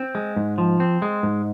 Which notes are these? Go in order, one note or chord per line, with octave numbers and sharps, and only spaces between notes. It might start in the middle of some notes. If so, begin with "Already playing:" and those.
Already playing: C4
G#3
G#2
F3
C4
G#3
G#2